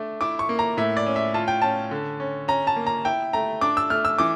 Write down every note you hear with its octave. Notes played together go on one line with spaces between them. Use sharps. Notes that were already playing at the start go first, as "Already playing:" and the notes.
Already playing: A3 D4
E4 D6
C#6
A#3
A#5
A2 E5
D5
C#4
E5
F4 A5
G5
C#4 A5
D3
C#4
C#4 A#5
A5
A#3
A#5
E4 G5
A3 A#5
D4 D6
E6
A3 F6
E6
E3 D6